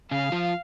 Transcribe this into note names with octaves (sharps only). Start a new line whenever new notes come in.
C#3 C#4 F5
F3 F4